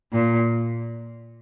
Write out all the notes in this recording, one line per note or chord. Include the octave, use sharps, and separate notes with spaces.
A#2